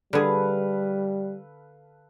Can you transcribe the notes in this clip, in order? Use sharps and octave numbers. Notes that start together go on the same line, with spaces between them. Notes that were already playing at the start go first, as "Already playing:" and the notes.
D3 G3 G#4 A4 B4 F5